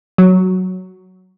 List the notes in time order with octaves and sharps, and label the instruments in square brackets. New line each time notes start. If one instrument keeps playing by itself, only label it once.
[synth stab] F#3